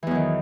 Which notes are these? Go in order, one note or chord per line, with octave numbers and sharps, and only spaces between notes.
E2 D#3 E3 F#3